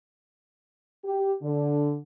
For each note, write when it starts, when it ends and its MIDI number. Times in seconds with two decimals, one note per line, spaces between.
1.05 1.32 67
1.42 1.96 50